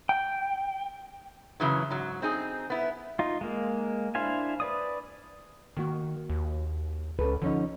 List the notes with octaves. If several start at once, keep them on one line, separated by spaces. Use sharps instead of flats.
G5
F#2 C#3 E3 F#3
G#2 F#3
C4 D#4 G#4
B3 E4
D#4 F4
G#3 A#3
D4 E4 C5 F5 G#5
B4 D5 D#6
D#3 A#3 F#4
D#2
C#2 C#4 A4 B4
D3 F3 C#4 D#4